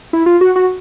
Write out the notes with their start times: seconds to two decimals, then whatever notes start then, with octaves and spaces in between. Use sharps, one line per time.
0.13 E4
0.26 F4
0.41 F#4
0.56 F#4